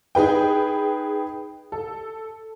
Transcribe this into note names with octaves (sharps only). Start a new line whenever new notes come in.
D#4 G#4 B4 G5
A4